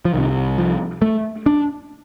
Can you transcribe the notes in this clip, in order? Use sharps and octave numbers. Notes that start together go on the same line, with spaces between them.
F3
C2 C3 D#3
F3
A3
D4